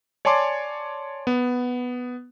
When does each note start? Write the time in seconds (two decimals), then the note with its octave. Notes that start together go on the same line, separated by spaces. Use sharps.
0.25 C#5 D5 G#5 A5 C6 D6
1.27 B3